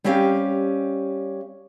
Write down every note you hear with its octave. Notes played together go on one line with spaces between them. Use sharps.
G3 C4 C#4 G4 F5